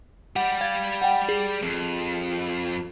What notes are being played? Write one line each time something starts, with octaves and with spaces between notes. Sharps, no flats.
G3 G4 F#5
F5 G#6 A6
F#5 G5
G#4
F2